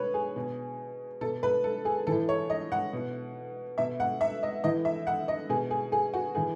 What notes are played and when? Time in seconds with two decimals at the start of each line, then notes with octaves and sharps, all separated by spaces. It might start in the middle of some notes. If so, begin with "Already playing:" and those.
Already playing: B2 B4 C#5
0.14 G#4
0.36 B2
1.21 B2 A4
1.43 B4
1.64 A4
1.85 G#4
2.07 A2 E3 A4
2.29 C#5
2.50 D#5
2.72 F#5
2.93 B2
3.78 B2 E5
4.00 F#5
4.21 E5
4.43 D#5
4.64 A2 E3 D#5
4.85 E5
5.07 F#5
5.28 D#5
5.49 B2 G#4
5.71 G#4
5.92 G#4
6.14 F#4
6.35 A2 E3 G#4